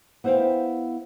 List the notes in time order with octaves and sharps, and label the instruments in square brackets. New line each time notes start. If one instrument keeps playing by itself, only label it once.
[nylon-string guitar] B3 E4 C5 D5 F5 G5